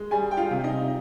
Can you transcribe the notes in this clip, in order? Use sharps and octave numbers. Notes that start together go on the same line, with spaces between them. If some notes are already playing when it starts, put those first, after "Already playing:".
Already playing: G#3
G3 G#4 G#5
G5
F4 F5
C3
D#4 D#5